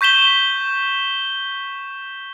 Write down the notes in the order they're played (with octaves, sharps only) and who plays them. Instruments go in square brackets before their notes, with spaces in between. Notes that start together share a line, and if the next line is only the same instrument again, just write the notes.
[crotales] C#6 G6 B6 E7 G7